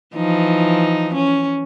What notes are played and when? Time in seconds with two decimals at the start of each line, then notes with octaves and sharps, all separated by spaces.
0.16 E3 F3 D#4
1.14 C#4